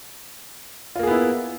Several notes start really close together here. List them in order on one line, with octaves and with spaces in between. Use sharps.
F4 A#3 G#4 B3 E4